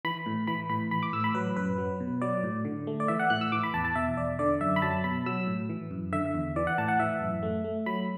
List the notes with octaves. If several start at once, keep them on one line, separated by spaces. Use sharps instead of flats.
E3 B5
A2
E3 B5
A2 B5
E3 B5
D6
A2 E6
B5
F#3 B4
F#2 B4
F#3
B2
F#3 D5
A2
D3
A3
D5
E3 E5
F#5
A2 F#6
E6
E3 D6
B5
E2 A5
A5
B2 E5
E2 D5
D3 D5
F#2 E5
B5
F#3 A5
B2 B5
F#3 E6
A2
E3
F#2
D3 E5
E2
E3 D5
F#5
A2 A5
F#5
E3 E5
F#2
A3
A3
F#3 B5